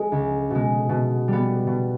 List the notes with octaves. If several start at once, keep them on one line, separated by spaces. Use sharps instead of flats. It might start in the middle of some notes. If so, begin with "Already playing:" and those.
Already playing: G#3
C#2
B2 G#3
B2
G3 B3
B2